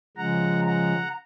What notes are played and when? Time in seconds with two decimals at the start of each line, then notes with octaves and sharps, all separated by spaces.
0.17 C#3 F3 G#3 F#5 A#5
0.65 F#5 A#5